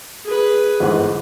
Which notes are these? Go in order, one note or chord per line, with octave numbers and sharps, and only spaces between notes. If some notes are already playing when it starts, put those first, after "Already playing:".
G#4 B4
G1 E2 G#2